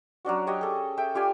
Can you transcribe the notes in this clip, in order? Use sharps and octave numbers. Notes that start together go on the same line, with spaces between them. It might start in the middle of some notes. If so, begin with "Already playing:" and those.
F#3 C#4 D4 F#4
G4 C#5 D#5
G#4 A4
A4 E5 G5
F4 G4 D5 G#5